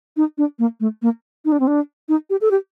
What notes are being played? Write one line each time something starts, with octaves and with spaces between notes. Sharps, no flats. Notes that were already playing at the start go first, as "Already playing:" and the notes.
D#4
D4
A#3
A3
A#3
D#4
D4
C4
D4
D#4
G4
A4
G4